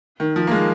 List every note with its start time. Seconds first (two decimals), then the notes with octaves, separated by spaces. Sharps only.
0.20 D#3
0.36 F3
0.47 A#3
0.51 G#3